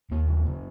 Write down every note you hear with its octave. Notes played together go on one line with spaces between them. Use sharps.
D#2 A#3
C#3
C#3